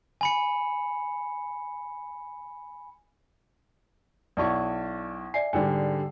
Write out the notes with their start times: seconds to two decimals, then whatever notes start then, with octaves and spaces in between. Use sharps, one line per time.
0.21 G#5 B5 C#7
4.37 B1 E4 D5 A5 C#6
5.34 D5 E5 G#5 C7
5.53 G#2 D3 G3 D5 G5 G#5